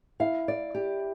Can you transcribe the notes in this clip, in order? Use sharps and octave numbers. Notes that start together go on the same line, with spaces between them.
E4 F5
D5
G4